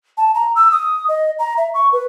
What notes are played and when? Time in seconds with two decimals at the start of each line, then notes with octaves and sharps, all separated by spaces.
0.18 A5
0.35 A#5
0.56 E6
0.72 D#6
1.09 D#5
1.39 A#5
1.58 E5
1.74 C#6
1.93 B4